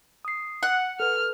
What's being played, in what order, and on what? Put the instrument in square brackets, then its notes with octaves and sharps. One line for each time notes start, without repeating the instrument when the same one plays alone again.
[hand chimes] D#6 C7
[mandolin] F#5
[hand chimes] A4 B4 [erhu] F6